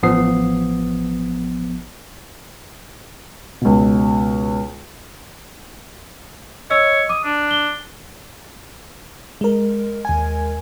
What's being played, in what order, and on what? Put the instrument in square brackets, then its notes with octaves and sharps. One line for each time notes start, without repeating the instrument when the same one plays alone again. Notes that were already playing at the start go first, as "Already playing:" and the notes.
[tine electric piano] A1 F3 B3 D#6 C7
[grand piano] C#2 B2
[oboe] C#5 [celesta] D#5 E6
[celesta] D6 [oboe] D#6
[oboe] D4
[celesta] G7
[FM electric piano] G#3 A#4
[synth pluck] D#2 G#5